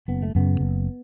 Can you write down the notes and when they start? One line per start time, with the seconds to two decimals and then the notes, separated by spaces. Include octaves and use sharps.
0.08 F#1 B3
0.22 A3
0.35 F#2 C#3 B3
0.61 F#1